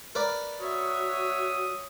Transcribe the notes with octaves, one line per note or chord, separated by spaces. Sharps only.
A#4 B4 D5
F#4 C#5 E5 D#6